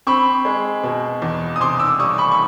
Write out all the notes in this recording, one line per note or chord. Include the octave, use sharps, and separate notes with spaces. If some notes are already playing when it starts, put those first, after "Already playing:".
C4 B5 C#6
G#3
B2
E2
D#6
C3 C6 D6
D6 E6
G3 C#6 D#6
B5 C#6
C#6